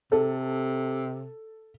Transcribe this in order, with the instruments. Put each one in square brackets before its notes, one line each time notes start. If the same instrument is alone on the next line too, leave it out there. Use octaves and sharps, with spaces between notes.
[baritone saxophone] C3 [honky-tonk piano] A4